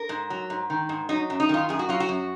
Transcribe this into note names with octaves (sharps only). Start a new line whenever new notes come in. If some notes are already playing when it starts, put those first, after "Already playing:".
Already playing: A#4
G#2
F#3
G#2
D#3
G#2
F#3 D#4
F#2
D#4
D#3 F4
F#2 G#4
F#4
F#3 F4
F#4
F#2